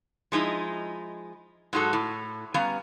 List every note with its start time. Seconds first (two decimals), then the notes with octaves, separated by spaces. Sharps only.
0.32 F3 G#3 D#4 E4
1.73 G#2 F#3 G#3 F#4 A4
1.93 A2
2.54 G3 B3 C#4 F5 A#5